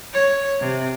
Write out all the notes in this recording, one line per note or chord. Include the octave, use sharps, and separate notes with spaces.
C#5
C3